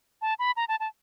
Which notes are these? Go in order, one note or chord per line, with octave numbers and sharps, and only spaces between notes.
A5
B5
A#5
A5
A5